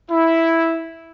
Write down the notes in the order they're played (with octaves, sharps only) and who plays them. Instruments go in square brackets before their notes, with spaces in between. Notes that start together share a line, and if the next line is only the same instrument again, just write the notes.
[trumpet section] E4